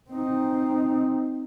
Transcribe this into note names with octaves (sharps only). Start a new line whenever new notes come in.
C4 D#4